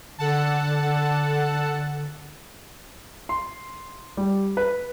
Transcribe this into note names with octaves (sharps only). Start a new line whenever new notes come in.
D3 A4 F#5 A5
C6
G3
B4